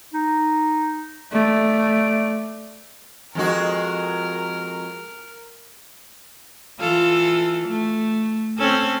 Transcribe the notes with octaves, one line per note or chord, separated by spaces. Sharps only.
D#4
A3 D5
F2 G#3 F#4 A#4
E3 F4 A4
A3
C4 C#4 A4